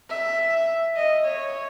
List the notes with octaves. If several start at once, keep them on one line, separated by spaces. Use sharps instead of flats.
E5
D#5
C#5